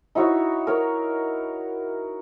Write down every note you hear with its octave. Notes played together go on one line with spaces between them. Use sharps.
D#4 E4 F#4 C#5
A#4 C#5